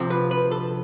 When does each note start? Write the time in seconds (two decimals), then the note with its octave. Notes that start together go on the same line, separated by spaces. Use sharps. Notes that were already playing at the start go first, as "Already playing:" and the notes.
Already playing: D2 C3 F3
0.10 B4
0.31 B4
0.51 A4